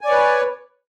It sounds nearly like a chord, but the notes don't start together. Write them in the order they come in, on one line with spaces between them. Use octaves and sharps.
G#5 D5 C#5 B4